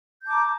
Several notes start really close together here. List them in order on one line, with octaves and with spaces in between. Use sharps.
G6 A5 D6 A#5